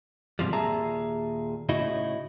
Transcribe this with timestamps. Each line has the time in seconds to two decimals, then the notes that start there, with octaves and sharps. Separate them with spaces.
0.39 G#2 C3 F3 G3
0.53 D#2 A#2 G#4 E5 A5 A#5
1.69 A2 C#3 D#4 E4 F#4 D#5